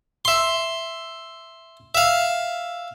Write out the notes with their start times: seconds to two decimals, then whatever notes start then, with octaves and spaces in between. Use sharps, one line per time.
0.25 E5 C6
1.95 E5 F5